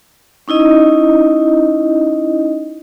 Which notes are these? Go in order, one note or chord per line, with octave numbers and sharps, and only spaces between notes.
C#4 D#4 E4 D#5